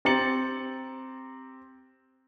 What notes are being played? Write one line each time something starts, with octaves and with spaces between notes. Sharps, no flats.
C4 G4 A#5 A6 C#7 F#7